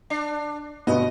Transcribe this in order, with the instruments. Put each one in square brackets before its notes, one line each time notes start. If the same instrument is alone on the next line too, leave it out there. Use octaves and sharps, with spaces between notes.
[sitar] D4
[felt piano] G1 B2 B3 [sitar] D#5